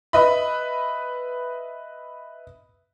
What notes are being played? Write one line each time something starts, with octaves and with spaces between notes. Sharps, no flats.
B4 D#5 E5 B5